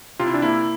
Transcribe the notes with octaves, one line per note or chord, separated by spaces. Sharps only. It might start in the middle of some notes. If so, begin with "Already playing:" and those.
C3 F4
E4
D4
A#3 E4